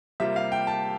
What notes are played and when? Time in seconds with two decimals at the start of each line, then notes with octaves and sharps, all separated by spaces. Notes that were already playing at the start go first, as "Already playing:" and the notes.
0.20 C3 G3 A#3 F4 E5
0.36 F5
0.52 G5
0.67 A5